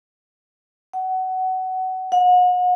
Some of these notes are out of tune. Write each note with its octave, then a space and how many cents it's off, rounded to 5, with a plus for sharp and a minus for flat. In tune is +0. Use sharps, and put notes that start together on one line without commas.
F#5 +20
F#5 -40